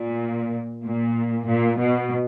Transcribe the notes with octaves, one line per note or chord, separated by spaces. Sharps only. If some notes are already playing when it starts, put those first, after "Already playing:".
Already playing: A#2
A#2
A#2
B2